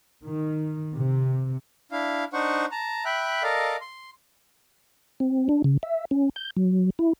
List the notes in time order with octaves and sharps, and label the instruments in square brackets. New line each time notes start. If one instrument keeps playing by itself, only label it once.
[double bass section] D#3
C3
[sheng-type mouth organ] D4 E4 F5
D4 D#4 C5 F#5 C#6
A5 A#5
E5 G5 B5 F#6
A4 A#4 D5 D#5 F5
C6
[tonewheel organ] C4
D4
C#3
E5
C#4
G6
F#3
E4